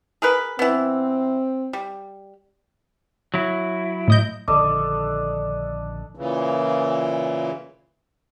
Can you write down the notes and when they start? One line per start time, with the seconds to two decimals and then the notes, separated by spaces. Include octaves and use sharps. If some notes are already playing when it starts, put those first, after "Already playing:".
0.22 G#4 A#4 B4
0.59 E3 B3 C4
1.73 G3
3.34 F#3 E4
4.08 A2 D#5 G6
4.48 A#1 D3 D#3 D4 A4 D#5 D6
6.15 A#2 C#3 E3